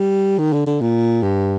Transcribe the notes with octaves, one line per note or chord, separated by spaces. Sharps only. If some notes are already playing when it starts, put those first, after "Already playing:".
Already playing: G3
D#3
D3
D3
A#2
G2